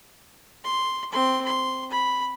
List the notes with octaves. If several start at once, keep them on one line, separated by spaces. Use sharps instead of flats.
C6
C4 C6
C6
B5